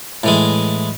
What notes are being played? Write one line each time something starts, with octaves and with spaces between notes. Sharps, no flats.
A2 E3 G#3